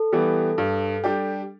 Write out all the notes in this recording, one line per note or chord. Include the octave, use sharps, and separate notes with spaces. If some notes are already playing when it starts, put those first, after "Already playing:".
Already playing: A4
E3 G3 B3
G2
G3 D4 G4